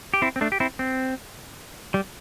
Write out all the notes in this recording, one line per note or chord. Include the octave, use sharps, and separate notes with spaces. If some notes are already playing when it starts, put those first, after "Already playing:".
G4
C4 E4
C4
A3 D4
G4
C4 E4
C4
G3